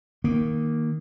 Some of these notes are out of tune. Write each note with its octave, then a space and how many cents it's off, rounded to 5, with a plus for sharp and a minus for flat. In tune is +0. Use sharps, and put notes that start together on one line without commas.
D#3 +0 A#3 +0